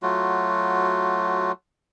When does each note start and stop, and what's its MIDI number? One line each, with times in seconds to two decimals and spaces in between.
0.03 1.52 54
0.03 1.52 57
0.03 1.52 65
0.03 1.52 66